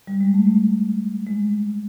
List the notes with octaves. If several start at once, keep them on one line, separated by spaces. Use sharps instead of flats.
G3
G#3
A3
A3
G#3